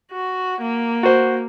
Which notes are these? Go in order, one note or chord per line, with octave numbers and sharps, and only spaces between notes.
F#4
A#3
F#4 C5